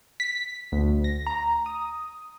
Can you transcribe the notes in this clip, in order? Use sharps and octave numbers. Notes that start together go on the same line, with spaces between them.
B6
D2
A#6
A#5
D#6